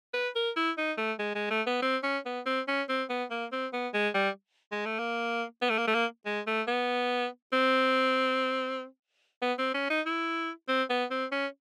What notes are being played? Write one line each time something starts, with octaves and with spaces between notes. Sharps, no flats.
B4
A#4
E4
D#4
A3
G#3
G#3
A3
B3
C4
C#4
B3
C4
C#4
C4
B3
A#3
C4
B3
G#3
G3
G#3
A3
A#3
B3
A3
A#3
A3
A#3
G#3
A3
B3
C4
B3
C4
C#4
D#4
E4
C4
B3
C4
C#4